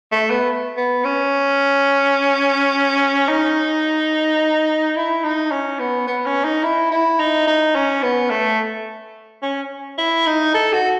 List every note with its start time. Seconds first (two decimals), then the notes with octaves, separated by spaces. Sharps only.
0.12 A3
0.30 B3
0.77 B3
1.05 C#4
3.29 D#4
4.96 E4
5.24 D#4
5.52 C#4
5.79 B3
6.07 B3
6.26 C#4
6.45 D#4
6.63 E4
6.91 E4
7.19 D#4
7.47 D#4
7.75 C#4
8.03 B3
8.30 A3
9.42 C#4
9.98 E4
10.26 D#4
10.54 A4
10.73 F#4